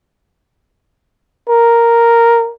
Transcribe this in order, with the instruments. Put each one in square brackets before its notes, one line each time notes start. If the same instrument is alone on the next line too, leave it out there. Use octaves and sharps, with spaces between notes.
[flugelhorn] A#4